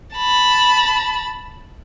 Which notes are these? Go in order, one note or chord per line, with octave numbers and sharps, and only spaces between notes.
A5 B5